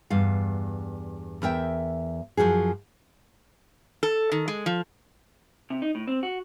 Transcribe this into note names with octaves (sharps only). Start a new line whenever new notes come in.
E2 G2 F5
E2 A#4 E5 G5
F#2 F3 F#4 G#4
A4
D#3
G#3
F3
C3
D#4
A2
C4
F#4